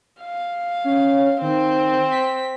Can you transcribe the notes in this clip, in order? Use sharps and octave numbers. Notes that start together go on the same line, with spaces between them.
F5
C#4
D#3 C4
B6